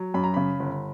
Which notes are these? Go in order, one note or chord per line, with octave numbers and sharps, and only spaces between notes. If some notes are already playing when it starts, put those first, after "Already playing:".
Already playing: F#3
F#2 B5
A#5
C#3 B5
G1